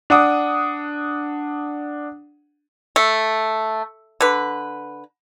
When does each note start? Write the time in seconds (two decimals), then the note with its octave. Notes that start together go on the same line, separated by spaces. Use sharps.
0.10 D4 F#5 D6 D#6
2.96 A3
4.21 D3 B4